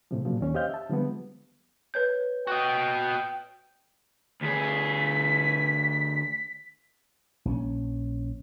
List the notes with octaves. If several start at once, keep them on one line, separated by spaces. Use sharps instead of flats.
A2 C3 F3
A#2 C#3 F3 F#3
D#2 C#4 C#5
G4 C5 D#5 F5 F6 G6
E5 A5
D3 F3 G3 G#3 B3
B4 C#5 G6
F#4 D#5 G5
D2 G#4 B6
A#1 E3 C#4